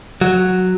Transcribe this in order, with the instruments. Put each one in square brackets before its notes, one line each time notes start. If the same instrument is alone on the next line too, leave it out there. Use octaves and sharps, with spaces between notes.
[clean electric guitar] F#3